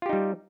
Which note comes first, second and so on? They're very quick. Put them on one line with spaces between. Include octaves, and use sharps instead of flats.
F4 G4 D#4 G3